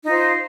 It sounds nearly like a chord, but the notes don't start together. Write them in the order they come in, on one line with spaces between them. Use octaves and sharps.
D#4 F4 C5